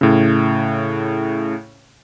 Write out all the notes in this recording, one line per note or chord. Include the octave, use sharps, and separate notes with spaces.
A2 C#3